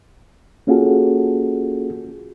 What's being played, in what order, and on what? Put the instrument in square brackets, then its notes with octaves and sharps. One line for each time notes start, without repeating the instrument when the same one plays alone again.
[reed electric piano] A#3 C#4 F4 F#4 G#4 A4